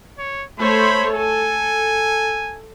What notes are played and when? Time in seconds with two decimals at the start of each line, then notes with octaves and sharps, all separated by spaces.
0.18 C#5
0.59 A3 C5 C#5 B5
1.12 A4 G#5